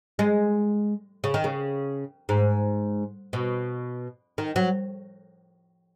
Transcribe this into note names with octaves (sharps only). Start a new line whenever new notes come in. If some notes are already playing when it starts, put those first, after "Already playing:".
G#3
C#3
D#3
C#3
G#2
B2
D#3
F#3